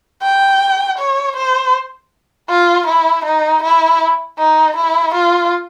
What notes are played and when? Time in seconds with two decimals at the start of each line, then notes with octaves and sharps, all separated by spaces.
0.23 G5
0.98 C#5
1.37 C5
2.49 F4
2.87 E4
3.25 D#4
3.63 E4
4.38 D#4
4.76 E4
5.14 F4